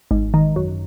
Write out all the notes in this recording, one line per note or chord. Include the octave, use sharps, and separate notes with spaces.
G#1
D#3
F#2